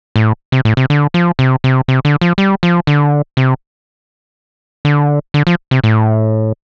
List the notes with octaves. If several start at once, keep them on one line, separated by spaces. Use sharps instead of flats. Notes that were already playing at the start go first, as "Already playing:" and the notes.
A2
C3
A2
C3
D3
F3
C3
C3
C3
D3
F3
G3
F3
D3
C3
D3
D3
F3
C3
A2